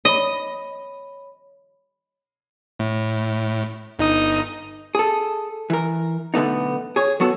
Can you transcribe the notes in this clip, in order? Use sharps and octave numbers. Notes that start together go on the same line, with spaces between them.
C#5 D#5 B5
A2
G1 D#4 D#6
G#4 A4
E3 A#4
B1 D3 A3 B3 D#4
G#4 C#5
F#3 B3 F#4 A4